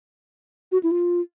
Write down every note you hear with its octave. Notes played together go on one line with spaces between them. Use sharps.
F#4
E4
F4